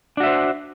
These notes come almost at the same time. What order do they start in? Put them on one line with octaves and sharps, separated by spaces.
D4 F#4 E5 C5